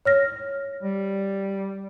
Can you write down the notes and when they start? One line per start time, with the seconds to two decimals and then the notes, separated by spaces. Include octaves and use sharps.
0.05 C#5 F6 A#6
0.83 G3